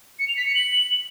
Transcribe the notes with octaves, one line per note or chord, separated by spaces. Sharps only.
C#7
F7
B6
C#7
F#7